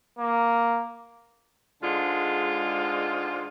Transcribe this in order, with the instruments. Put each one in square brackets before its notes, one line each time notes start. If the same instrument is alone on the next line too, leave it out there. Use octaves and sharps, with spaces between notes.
[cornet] A#3
[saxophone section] G#2 D3 G#3 F4